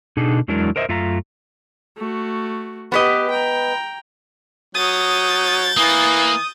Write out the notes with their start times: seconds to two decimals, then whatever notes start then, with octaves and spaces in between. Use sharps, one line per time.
0.17 B2 D4 D#4 G#4 A4
0.48 E2 F#3 G#3 D4 E4 A#4
0.76 A#4 C5 D#5 E5
0.89 F#2 A3 F4 E5 F5 A#5
1.98 A3 F#4
2.92 B3 G4 B4 D#5
3.31 G5 A#5
4.75 F#3 D#6 G6 A6
5.77 E3 A#3 D#6